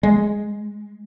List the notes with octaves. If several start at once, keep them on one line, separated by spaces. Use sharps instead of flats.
G#3